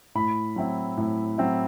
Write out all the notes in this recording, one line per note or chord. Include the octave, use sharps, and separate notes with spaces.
A2 B5
F#3 C4 E4
A2
F#3 C4 E4